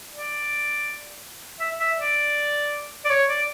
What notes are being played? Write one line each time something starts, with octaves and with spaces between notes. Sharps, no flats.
D5
E5
E5
D5
D5
C#5
D5